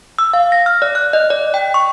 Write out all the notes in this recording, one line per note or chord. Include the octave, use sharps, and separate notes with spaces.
E6
F5
A#6
F6
D5
F#6
D#5
D5
G5
C#6